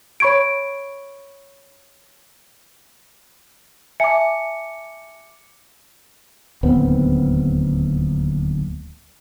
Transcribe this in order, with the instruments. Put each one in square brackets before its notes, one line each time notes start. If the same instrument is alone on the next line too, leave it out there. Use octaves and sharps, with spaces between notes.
[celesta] C#5 B5 C#6 G#6 D7
[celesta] E5 G#5 A5 [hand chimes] D6 C#7
[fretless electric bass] D1 D#2 B3 C4